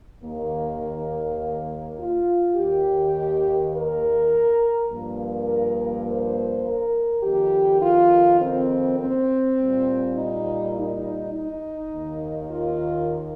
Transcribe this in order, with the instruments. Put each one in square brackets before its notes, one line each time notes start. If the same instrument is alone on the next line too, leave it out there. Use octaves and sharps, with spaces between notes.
[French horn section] D#2 D#3 A#3
F4
D#2 D#3 A#3 G4
A#4
G2 F3 A#3
A#4
C5
A#4
F2 D#3 A#3 G4
F4
C4
C4
A#2 G3 A#3
D#4
D#4
D#4
D#2 D#3 A#3
F4